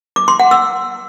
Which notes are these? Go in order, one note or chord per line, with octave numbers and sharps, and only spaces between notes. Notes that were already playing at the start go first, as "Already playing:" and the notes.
D6
C6
F#5
E6